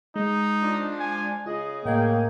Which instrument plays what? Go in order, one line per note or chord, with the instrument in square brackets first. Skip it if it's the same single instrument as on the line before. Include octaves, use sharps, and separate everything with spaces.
[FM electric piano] G#3 [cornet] D#4
[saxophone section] F3 D4
[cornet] G#5
[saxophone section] C#3 G#4 [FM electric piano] F4 [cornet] D#5
[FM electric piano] A2 D#5 G#6 [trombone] A#3 [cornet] G5